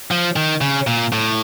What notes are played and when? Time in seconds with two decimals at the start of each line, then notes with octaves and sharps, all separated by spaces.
0.11 F3
0.36 D#3
0.61 C#3
0.87 A#2
1.13 A2